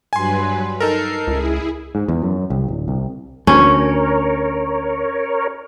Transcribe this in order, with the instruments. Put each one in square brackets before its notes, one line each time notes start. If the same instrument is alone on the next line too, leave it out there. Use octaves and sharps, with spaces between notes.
[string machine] G2 F#3 B4 [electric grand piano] G#5 C6
[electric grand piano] D#4 A4 A#4 [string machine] C7
[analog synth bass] C#2 [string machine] E4 G#4
[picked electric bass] G#2
E2
F#2
C2
D1
C2
[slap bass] D2 [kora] C#4 [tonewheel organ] A#4 C#5